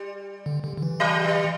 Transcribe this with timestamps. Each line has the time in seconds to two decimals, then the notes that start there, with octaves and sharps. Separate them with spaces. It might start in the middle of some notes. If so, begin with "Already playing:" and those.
Already playing: G3
0.46 D3
0.64 D3
0.77 D3
0.83 E3
1.00 F#3
1.24 G3